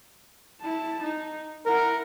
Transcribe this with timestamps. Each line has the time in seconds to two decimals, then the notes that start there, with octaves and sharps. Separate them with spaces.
0.60 E4 A5
1.02 D#4
1.66 E4 A#4 F#5